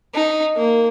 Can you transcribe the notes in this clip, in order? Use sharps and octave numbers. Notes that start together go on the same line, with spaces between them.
D#4
A#3